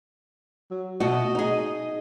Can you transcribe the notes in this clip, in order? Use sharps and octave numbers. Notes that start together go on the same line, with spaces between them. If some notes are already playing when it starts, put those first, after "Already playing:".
F#3
B2 A3 F#4 D#5
D#4 G#4